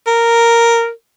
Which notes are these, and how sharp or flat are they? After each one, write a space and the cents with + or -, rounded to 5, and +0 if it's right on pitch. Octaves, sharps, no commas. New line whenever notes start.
A#4 -5